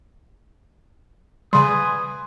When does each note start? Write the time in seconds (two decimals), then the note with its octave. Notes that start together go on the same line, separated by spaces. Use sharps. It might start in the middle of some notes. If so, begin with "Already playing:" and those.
1.53 C#3 G3 B4 G#5 C6 D#6